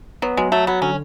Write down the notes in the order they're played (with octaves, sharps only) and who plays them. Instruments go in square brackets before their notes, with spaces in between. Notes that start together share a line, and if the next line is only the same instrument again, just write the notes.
[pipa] F#3 [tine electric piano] B3
[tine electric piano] F#3 [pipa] G#3
[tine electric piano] F#3 [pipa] A3
[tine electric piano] F#3 [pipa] B3
[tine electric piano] D3 [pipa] C#4